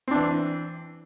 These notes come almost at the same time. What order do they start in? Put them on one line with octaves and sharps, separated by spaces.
C4 D4 E3